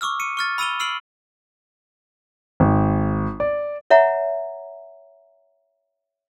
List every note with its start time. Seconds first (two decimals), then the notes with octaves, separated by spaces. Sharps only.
0.01 C#6 D6 E6 F6
0.20 C#7 D#7
0.37 C#6 F6 A6
0.58 B5 E6 A6 D#7 F7 G7
0.80 E6 F6 C7 D7 F#7
2.60 G#1
3.40 D5
3.90 C#5 E5 F#5 A#5